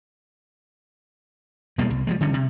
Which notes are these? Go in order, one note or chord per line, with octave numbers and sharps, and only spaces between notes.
B2 G3 G#3 A#3
C2
F3 G3 G#3
D3 G3 C#4
C3